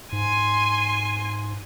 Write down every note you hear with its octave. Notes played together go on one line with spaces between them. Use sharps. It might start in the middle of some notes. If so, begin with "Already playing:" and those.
G#2 G#5 C6